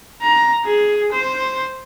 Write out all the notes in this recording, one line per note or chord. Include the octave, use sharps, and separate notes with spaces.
A#5
G#4
C5